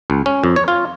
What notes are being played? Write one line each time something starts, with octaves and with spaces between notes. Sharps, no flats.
C#2
C#4
F2
C#5
F4